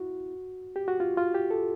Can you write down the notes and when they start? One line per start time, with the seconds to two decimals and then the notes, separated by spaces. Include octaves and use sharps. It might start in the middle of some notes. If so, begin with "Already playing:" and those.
Already playing: E4 F#4
0.76 G4
0.88 F#4
1.00 F4
1.17 F4
1.34 G4
1.51 A4